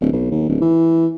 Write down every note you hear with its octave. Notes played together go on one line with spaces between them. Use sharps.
D1
B1
D#2
D1
E3